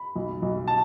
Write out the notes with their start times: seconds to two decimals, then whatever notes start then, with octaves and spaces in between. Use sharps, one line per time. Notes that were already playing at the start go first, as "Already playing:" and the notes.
Already playing: B5
0.16 B1
0.42 B1
0.68 A5